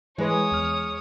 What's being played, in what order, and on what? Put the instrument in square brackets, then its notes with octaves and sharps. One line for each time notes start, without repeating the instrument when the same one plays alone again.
[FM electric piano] E3 B4 [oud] G#3 [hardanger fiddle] C#5 D#6
[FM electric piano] E2 F6